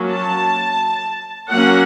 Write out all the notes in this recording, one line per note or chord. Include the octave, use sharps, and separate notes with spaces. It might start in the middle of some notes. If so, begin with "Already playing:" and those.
Already playing: F#3 A#3 C#4
A5
F#3 A#3 C#4 F#5